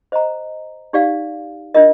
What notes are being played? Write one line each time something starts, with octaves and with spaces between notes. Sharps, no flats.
C5 D#5 A#5
D#4 G4 D5 F5
D4 F4 A#4 D#5